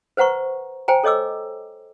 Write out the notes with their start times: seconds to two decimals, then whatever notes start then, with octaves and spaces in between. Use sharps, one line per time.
0.17 B4 C5 F#5 A#5 C#6
0.88 C5 G5 G#5 A#5
1.04 A4 C#5 D#5 D6 E6